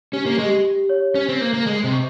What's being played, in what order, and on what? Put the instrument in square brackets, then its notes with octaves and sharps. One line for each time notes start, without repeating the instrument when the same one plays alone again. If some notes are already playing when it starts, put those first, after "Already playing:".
[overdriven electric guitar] C#4 [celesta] G4
[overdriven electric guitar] A#3
[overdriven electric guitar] G#3 [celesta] G4
[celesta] G4
C#5
[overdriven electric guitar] C#4 [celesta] C5
[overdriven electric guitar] C4
[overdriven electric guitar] A#3 [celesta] C5
[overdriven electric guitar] A#3
[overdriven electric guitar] G#3 [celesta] D#5
[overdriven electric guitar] C3
[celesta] C#6